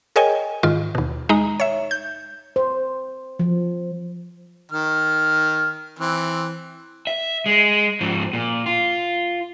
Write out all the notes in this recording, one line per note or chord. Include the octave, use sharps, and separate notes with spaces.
G#4 A#4 C#5 D#5 G5 G#5
G#2 D#3 F4
D#2 B2
G#3 D#4 A#5
C#5 E5
G6
C5
F3
D#3 F6
E3 C4
E5
G#3
G#2 F3
A#2
F4